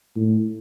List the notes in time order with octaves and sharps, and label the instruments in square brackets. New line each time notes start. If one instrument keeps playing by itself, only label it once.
[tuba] A2